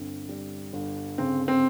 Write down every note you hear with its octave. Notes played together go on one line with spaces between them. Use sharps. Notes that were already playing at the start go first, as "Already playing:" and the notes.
Already playing: G1 C4
G3
G1
C#3 C4
C4